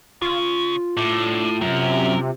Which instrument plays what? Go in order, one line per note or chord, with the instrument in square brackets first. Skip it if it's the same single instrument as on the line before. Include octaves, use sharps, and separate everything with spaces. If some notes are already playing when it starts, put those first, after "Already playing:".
[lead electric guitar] C#3 [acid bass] F4
[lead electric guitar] C2 D4 [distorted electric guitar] A2
[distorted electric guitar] F#2 [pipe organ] C3 [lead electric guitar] A#4